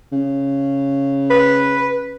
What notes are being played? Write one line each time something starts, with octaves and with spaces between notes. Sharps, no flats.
C#3
B4